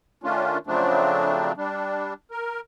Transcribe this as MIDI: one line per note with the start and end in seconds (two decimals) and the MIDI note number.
0.23 0.58 51
0.23 0.58 57
0.23 0.58 61
0.23 0.58 62
0.23 0.58 65
0.67 1.52 49
0.67 1.52 53
0.67 1.52 54
0.67 1.52 57
0.67 1.52 60
0.67 1.52 62
1.57 2.13 55
1.57 2.13 62
2.31 2.60 70